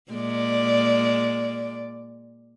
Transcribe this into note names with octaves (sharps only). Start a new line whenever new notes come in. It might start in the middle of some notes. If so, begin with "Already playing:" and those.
A#2 G#3 D5